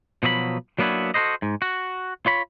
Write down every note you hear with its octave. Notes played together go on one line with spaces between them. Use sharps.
B2 F3 F#3 D#5 B5
F#3 A#3 B3 D4 E4 F#4
F#4 A4 B4 C5 D#5
G#2
F#4
F4 C#5 B5